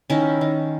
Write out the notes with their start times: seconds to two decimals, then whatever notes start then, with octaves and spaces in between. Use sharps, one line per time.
0.10 D#3 C#4 E4
0.41 D#3